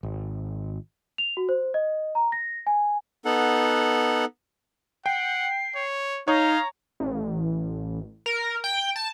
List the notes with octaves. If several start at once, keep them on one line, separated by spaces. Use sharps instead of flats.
G#1
F7
F#4
C5
D#5
A#5
A#6
G#5
B3 D#4 A4 F#5
F#5 G5 C7
C#5
D#4 C#5 F5 A#5
A1
A#4
G5
A5